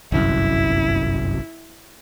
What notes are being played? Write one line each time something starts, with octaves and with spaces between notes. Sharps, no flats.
G1 C2 F#2 E4